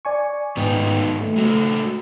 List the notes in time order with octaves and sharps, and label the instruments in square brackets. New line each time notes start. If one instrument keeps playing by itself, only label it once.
[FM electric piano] D5 G#5 C#6
[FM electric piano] G#2 G5 [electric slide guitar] D#3 B3 D#4
[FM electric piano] A3
[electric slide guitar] G#3 F#4 A4